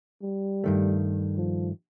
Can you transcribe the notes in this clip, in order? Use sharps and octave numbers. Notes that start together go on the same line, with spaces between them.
G3
G2 D#3 A3
F3